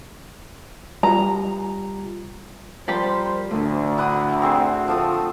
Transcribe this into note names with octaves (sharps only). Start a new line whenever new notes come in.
G3 F4 G4 A#5
F3 G3 G4 A#4 C5
D2 A2 D3
E4 F#5 D#6
C4 G#4 C5
F3 A3 D#6